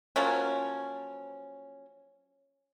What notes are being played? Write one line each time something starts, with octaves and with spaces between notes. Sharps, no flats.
F3 F#3 A#3 C#4